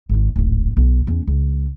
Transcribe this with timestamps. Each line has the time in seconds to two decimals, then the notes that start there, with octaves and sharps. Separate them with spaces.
0.09 G#1 D#3
0.36 D1 G#1
0.77 B1
1.07 E2 C#4
1.27 C#2